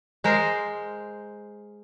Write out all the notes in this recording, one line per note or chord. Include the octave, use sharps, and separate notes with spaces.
G#3 A#4 C5